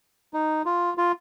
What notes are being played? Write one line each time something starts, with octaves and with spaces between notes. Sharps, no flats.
D#4
F4
F4